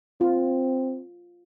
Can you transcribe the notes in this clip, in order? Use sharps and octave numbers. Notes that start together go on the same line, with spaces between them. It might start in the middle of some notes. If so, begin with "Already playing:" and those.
C4 F4